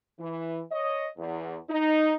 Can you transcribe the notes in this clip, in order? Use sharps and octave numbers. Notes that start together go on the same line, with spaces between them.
E3
C#5 D#5
E2
D#4